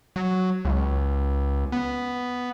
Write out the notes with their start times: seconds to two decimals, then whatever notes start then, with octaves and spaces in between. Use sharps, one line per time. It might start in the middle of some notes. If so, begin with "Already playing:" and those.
0.16 F#3
0.65 C#2
1.72 B3